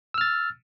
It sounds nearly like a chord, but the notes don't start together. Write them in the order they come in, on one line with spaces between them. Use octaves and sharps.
E6 F6 A6